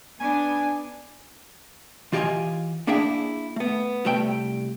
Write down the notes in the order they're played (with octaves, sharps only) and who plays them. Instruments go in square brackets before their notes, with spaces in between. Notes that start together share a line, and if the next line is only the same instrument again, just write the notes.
[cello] B3 D4 [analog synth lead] G#5
[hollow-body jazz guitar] E3 F4 G4 D#5 F5 G#5
A#3 D4 E4 G#4 E5 G5
A3 B3
C2 G3 A3 E5 G5